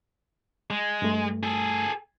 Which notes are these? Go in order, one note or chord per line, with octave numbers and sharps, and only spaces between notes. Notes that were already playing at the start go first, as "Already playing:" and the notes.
G#3
G2 A3
G#4 A4